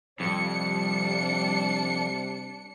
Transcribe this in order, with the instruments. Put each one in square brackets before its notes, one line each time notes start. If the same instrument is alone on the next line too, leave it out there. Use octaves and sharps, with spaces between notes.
[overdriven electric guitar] F2 [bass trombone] C3 [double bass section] G3 [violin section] D4 C#7